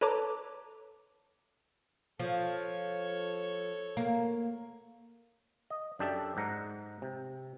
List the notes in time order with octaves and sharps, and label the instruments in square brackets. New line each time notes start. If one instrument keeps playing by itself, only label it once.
[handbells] A4 B4 C#5 A5 A#5 D6
[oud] F3 [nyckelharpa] A4 C#5
[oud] A#3
[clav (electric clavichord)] D#5
F#2 D4 G4 A4 D5 E5
G#2 F#5 A#5
C3